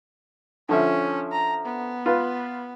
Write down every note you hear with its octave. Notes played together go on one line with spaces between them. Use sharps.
D3 F3 C#4 E5
A#5
B3
F4 B4